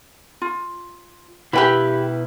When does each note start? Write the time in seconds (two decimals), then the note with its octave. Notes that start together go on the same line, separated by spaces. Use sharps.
0.42 F4
1.53 B2 E4 G4 B4 G5 B5